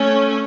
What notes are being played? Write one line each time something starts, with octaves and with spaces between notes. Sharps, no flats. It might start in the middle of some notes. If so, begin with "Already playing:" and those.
Already playing: A3 C#4